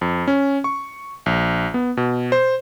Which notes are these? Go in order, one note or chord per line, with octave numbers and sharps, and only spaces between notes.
F2
C#4
C#6
A#1
B3
B2
C5